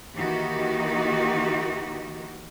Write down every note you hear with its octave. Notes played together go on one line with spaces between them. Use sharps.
D#3 E3 A#3 D#4 F#4 G4